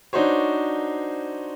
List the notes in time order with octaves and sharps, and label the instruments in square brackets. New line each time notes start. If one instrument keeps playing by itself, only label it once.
[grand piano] D4 D#4 F#4 C5 C#5